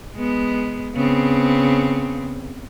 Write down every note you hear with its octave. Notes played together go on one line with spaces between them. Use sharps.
G#3 B3
C#3 B3 C4